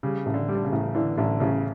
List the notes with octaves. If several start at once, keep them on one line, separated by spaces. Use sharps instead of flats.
C#3 G3
A1
D3
G3
D3
C#3
A1
D3 E3
A1 D3
A1 C#3